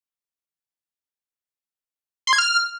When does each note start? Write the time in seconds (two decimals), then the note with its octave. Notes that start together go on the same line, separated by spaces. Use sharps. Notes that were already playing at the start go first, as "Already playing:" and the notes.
2.27 C6
2.33 G#6
2.38 F6